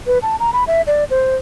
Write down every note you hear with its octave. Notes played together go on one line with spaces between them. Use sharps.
B4
A5
A#5
B5
E5
D5
C5